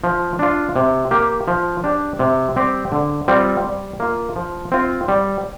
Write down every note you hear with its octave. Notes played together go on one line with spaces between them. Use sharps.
F3
D4 F4
C3
A#3 G4
F3
D4 G4
C3
G3 C4 G4
D3
G3 C4 F4
G3
A#3 F4
F3
C4 F4
G3